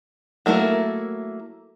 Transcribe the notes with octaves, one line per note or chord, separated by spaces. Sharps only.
F#3 A3 A#3 E4 A#4